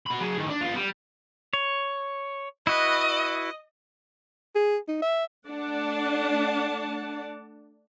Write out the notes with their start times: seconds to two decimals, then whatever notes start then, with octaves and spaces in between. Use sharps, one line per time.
0.06 F#4 B5
0.20 F#3 G#4
0.37 A2 D#3
0.49 D4
0.61 B3 F4
0.75 G3
1.53 C#5
2.67 E4 F#4 B4 D#5
4.55 G#4
4.88 D#4
5.02 E5
5.48 A3 D4 D5 F#5 A5